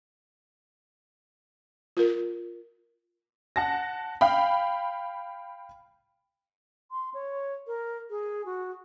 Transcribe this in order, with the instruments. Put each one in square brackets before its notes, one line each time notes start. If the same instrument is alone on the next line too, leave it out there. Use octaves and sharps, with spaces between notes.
[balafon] F4 A#4
[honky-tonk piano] F#5 A5 A#6
F5 G5 B5
[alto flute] C6
C#5
A#4
G#4
F#4